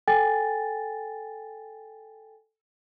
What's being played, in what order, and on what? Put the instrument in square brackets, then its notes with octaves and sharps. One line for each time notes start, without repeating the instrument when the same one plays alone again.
[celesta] A4 G5 G#5 A6